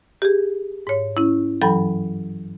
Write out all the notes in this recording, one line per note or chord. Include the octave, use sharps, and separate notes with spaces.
G4 G#4
G#2 C#5
C#4 E4
G2 E3 F#3 A4 G5 B5